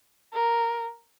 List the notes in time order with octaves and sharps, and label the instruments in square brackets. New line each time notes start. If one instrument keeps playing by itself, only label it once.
[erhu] A#4